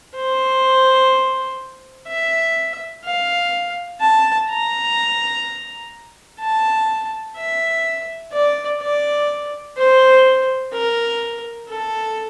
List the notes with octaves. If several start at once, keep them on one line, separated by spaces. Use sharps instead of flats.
C5
E5
F5
A5
A#5
A5
E5
D5
D5
C5
A#4
A4